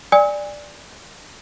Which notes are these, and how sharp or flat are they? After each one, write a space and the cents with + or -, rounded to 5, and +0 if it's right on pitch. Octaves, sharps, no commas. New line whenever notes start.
D5 +0 G#5 -25 E6 -45